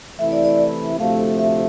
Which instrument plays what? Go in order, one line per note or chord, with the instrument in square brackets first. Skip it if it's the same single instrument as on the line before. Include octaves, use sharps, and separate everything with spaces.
[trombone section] C3 E3 A3 E4 [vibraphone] E5
[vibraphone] D5
D5
[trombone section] D2 C3 F3 A3 [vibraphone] F5
[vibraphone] E5